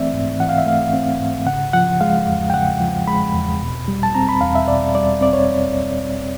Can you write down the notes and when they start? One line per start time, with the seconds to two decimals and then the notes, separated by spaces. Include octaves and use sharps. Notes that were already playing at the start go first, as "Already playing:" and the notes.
Already playing: E3 A3 C4 D5 E5
0.13 G#2
0.40 E3 F#5
0.49 F5
0.58 E5
0.66 A3 F5
0.94 C4
1.20 G#2
1.46 C#3 F#5
1.73 F3 F#5
2.01 G#3 F5
2.28 E2
2.50 G5
2.54 C#3 F#5
2.80 F3
3.07 G#3 B5
3.34 E2
3.62 B2
3.88 G3
4.03 A5
4.15 C4 A#5
4.29 B5
4.41 E2 F5
4.55 E5
4.68 B2 D5
4.95 G3 D5
5.21 C4 D5
5.33 C#5